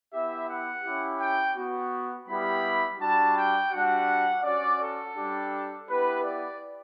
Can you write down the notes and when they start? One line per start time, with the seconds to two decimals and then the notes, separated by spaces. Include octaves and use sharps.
0.13 B3 E4 G4 E5
0.48 F#5
0.84 C#4 E4 G4
1.21 G5
1.57 B3 F#4
2.29 G3 B3 E4 G4 B5
3.00 G3 D4 F#4 A5
3.36 G5
3.72 G3 D4 F#4 F#5
4.44 C#4 F#4 D5
4.80 A4
5.16 G3 D4 G4
5.88 B3 E4 G4 B4
6.24 D5